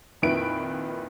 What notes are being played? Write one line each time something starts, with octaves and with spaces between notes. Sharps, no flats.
F2 A#2 D#3 E4 B4 D7